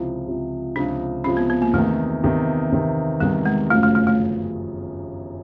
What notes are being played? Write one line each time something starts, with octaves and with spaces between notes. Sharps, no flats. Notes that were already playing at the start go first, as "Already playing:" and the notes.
Already playing: C#2 C3 F3 E4
C#2 C3 F3
C#2 C3 F3 D4
C#2 C3 F3 C#4
B3
B3
A#3
E2 C3 D#3 A3
E2 C3 D#3
E2 C3 D#3
E2 C3 D#3 G3
G#3
G1 F#2 C#3 F3 A3
A3
A3
A3